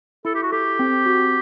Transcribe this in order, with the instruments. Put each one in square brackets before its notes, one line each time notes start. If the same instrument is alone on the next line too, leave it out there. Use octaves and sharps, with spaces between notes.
[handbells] E4 [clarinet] A4
[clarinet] G4
F#4
[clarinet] G4 [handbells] A4
[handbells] C4
F#4